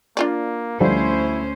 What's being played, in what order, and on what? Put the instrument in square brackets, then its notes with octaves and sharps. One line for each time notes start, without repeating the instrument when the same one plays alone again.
[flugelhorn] A#3 [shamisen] D4 F4 D5
[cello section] D2 C#4 C5 [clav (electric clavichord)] D3 F3 G3 [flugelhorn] E4